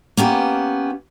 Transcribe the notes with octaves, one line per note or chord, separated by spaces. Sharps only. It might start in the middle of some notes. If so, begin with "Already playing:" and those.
A#3 B3 C#4 G4